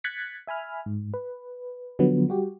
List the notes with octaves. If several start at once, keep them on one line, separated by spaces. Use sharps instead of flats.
F#6 G#6 A6 B6 C#7
E5 G#5 B5 F6
G#2
B4
D3 F3 F#3 B3
G3 F#4 G4